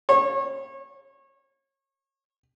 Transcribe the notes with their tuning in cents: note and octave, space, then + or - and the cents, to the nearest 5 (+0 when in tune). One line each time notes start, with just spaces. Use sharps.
C#5 -30